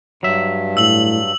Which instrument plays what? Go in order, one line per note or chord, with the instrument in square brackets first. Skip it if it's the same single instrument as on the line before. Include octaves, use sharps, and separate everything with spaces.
[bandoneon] G2 [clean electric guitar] F#3 E5
[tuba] A2 [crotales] E6 F#7